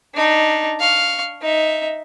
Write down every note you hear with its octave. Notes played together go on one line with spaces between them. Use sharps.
D4 D#4
F5 C#6
D#4 E5